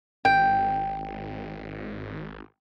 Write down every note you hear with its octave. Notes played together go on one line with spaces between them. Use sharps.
G#1 G5